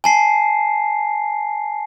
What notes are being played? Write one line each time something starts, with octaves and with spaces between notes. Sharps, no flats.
G#5 A5 C7